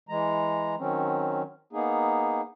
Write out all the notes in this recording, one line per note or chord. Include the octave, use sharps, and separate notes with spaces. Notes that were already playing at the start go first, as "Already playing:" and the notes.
E3 G#3 A#5
D#3 F#3 C4 C#4
A#3 B3 D#4 G#4